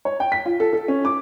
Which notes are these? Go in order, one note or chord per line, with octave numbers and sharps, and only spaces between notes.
C#5
G5
B6
F4
A4
A4
C#4
D6